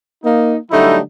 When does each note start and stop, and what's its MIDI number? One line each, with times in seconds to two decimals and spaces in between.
0.23 0.56 58
0.23 0.56 63
0.71 0.98 50
0.71 0.98 54
0.71 0.98 55
0.71 0.98 57
0.71 0.98 63
0.71 0.98 64